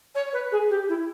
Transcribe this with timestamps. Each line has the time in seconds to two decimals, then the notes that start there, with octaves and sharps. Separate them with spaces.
0.15 C#5
0.33 B4
0.51 G#4
0.69 G4
0.88 E4